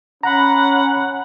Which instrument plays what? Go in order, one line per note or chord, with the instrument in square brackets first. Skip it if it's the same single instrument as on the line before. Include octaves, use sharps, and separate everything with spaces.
[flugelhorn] C#4 [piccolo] F#5 [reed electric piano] A#5 B5